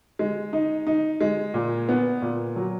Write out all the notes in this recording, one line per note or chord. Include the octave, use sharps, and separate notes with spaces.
G#3
D#4
D#4
G#3
A#2
B3
A#2
F#3